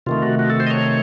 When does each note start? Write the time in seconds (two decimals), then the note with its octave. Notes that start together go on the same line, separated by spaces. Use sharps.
0.06 C3 D#3 A3 F4
0.22 F#4
0.39 F#4
0.50 A4
0.60 C5
0.67 D#5
0.70 C#5